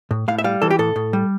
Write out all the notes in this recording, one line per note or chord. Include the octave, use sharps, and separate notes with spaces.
A2
A2 F5
E5
G3 F5
E3 A4
G4
A2 A4
A2
G3